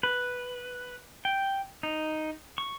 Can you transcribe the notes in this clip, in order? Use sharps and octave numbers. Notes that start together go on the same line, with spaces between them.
B4
G5
D#4
C#6